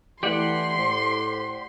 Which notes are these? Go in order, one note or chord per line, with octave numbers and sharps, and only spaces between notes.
E3 A3 G4 D5 F#5 C6
A2 C5